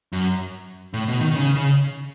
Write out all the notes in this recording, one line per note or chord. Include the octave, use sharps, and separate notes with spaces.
F#2
A2
B2
D#3
D#3
C#3
C#3